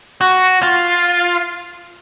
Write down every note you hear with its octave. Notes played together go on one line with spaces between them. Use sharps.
F#4
F4